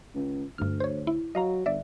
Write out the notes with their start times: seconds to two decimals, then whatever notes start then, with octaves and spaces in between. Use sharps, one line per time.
0.14 C#2
0.58 D2 G2 F6
0.80 C5 C#5
1.07 E4
1.35 F#3 D#5 F5 A#5
1.66 G1 D5 E5